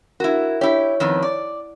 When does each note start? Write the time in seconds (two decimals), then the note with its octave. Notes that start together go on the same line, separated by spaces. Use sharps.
0.20 E4 F#4 A#4
0.61 E4 G4 C#5
1.00 F2 D#3 B3
1.22 D5